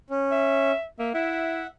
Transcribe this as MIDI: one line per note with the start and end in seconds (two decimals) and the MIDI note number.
0.10 0.72 61
0.31 0.86 76
0.99 1.13 58
0.99 1.10 76
1.14 1.63 64
1.14 1.67 76
1.14 1.67 78